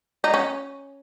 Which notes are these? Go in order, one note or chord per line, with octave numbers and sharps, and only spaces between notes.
D#4
C#4